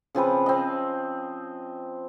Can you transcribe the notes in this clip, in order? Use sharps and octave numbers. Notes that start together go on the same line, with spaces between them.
C#3 F3 C4 B4
C4 D#5